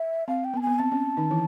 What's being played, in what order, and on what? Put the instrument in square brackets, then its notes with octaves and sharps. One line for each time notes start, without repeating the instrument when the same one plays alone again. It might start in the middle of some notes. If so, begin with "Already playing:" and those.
Already playing: [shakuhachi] E5
[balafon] C4 [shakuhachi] F5
[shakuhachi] G5
[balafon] B3 [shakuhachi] A5
[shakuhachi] G#5
[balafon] B3
[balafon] C4 [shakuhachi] A5
[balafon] C#4
D#3 D#4
E3 E4